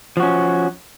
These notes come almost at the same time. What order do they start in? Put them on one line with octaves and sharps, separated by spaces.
F3 F#4 C#4